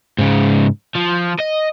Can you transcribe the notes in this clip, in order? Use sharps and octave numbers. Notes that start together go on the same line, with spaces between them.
G#2 C#3
F3
D#5